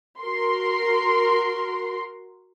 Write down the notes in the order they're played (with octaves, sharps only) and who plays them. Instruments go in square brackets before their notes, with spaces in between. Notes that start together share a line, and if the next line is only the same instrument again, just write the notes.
[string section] F#4 A#4 C6